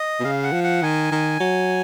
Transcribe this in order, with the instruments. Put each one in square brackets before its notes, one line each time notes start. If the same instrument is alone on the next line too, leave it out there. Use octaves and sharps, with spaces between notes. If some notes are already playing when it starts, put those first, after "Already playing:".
Already playing: [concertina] D#5
[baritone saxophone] B2
[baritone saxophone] C#3 [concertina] F5
[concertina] F#5
[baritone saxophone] F3
[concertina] F#5
[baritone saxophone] D#3 [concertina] G#5
[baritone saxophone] D#3
F#3